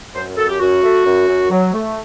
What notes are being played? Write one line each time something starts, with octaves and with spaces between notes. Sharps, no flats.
F#2 C5
F#2 A4
G4
F#2 F#4
A3
F#2
F#2
F#3
A3